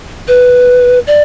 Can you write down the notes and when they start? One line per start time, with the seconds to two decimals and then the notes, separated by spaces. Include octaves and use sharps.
0.28 B4
1.07 D5